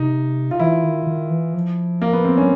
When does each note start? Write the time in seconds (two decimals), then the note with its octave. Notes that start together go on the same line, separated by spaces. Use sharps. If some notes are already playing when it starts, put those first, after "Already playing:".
Already playing: C3 D#4
0.51 F4
0.59 E3 E4
0.84 D#3
1.07 D#3
1.30 E3
1.54 F3
2.02 A#3
2.13 B3
2.25 C4
2.37 F#3 C#4